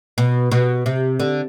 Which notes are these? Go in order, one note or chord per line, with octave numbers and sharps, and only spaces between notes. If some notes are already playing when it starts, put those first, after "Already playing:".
B2
B2
C3
D3